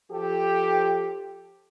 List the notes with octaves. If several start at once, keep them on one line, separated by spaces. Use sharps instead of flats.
F3 G4 A4